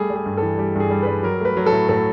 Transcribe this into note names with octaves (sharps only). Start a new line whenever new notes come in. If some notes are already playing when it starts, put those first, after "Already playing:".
Already playing: G3 A3 G#4
G3
G#4
G2
E3 A4
G3 G4
G2 G#4
G3
G3 B4
F#3 A#4
A3 B4
F#3
A4
A2
A2 A4